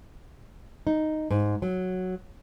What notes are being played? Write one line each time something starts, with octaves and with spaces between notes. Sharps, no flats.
D#4
G#2
F#3